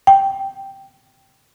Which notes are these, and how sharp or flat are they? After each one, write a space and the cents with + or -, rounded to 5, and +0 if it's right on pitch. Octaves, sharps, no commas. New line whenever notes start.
G5 -5